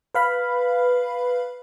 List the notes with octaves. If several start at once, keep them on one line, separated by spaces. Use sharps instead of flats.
B4 F5 B5